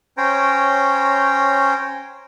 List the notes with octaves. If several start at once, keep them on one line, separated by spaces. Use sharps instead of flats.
C#4 C5 C#5 G5 A#5